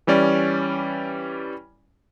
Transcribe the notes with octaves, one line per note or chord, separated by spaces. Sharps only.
E3 G3 C#4 D5